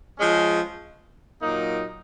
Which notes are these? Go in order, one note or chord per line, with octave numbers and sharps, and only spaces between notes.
F3 G#3 C#4
A#2 F#3 A#3 D#4